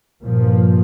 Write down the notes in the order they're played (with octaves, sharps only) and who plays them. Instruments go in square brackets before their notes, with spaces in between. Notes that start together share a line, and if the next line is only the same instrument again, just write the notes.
[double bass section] G2 A#2 F3